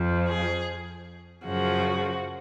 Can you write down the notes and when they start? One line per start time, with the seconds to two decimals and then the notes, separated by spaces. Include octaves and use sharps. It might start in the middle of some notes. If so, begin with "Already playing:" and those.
Already playing: F2 F3
0.28 G#4
1.46 F#2 C#3 F3 F#4